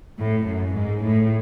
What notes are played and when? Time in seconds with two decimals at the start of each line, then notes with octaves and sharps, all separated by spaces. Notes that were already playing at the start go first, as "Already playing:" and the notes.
0.18 A2
0.46 F#2
0.75 G#2
1.05 A2